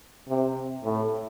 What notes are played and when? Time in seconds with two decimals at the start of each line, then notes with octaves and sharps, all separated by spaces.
0.28 C3
0.84 A2